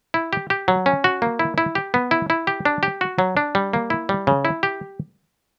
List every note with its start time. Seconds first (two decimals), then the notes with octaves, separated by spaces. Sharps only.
0.14 E4
0.33 G4
0.50 G4
0.68 F#3
0.86 C#4
1.04 F#4
1.22 A#3
1.39 E4
1.58 E4
1.75 G4
1.94 B3
2.11 E4
2.30 E4
2.47 G4
2.65 D4
2.83 G4
3.01 F#4
3.19 F#3
3.37 D4
3.55 G3
3.73 A#3
3.90 E4
4.09 G3
4.27 C#3
4.45 E4
4.63 G4